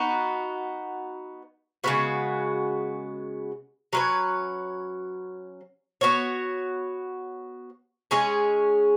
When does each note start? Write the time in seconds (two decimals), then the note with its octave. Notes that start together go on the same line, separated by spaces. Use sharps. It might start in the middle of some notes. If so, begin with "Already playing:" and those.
Already playing: B3 D#4 F#4
1.84 C#3 G#3 B3 F#4
3.93 F#3 C#4 B4
6.01 B3 F#4 C#5
8.11 G#3 C#4 G#4